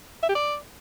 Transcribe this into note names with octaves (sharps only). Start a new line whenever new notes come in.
E5
G4
D5